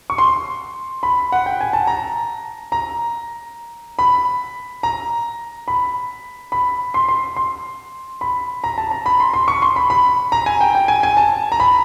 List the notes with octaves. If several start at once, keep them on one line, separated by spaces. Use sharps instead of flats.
C#6
C6
B5
F#5
G5
G#5
A5
A#5
A#5
B5
A#5
B5
B5
C6
C6
C6
B5
A#5
A5
A#5
B5
C6
C6
C#6
C6
B5
B5
A#5
G#5
G5
G5
G#5
G#5
A5
A#5
B5